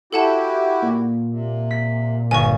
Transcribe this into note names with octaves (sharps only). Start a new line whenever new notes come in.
E4 F#4 G4 A4 F#5 A5
A#2
C3
B6
G1 G#5 C#6